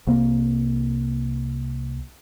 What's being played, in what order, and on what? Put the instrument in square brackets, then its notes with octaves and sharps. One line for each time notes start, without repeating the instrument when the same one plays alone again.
[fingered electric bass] C2 A#3